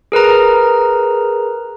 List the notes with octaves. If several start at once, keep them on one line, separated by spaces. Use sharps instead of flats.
G#4 A#4 B4 A#5